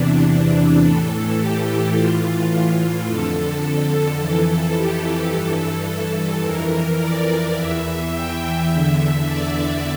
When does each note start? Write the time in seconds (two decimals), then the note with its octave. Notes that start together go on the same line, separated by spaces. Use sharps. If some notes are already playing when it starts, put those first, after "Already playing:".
Already playing: E2 C3 E3 D4
0.83 A2 E3 A4
1.40 G4
1.95 A2 E3 F4
3.08 F2 D3 A4
4.20 F2 E3
4.76 G4
5.05 G4
5.33 G2 E3 A4
5.89 A4
6.45 F2 E3 A#4
7.01 D5
7.57 E2 E3 E5
8.13 G5
8.69 E2 D3 E5
9.25 D5